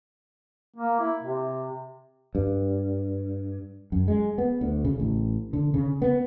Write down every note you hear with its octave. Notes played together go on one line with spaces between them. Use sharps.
A#3
E4
C3
G2
F#2
G#3
B3
D2
C#3
A1
D3
C#3
B3